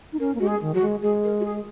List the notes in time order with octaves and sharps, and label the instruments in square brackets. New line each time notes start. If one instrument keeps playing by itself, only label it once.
[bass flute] D#4
[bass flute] C#4 [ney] A#4
[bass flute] A#3
[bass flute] G#3 [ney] F#4
[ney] G#4
[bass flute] D#3
[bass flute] F#3 [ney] F#4
[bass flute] G#3
[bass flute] G#3 [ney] G#4
[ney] A#4
F#4
G#4